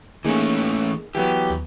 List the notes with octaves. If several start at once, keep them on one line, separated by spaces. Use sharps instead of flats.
E3 A3 A#3 C#4 D#4 G#4
E3 F#3 B3 G4
D#2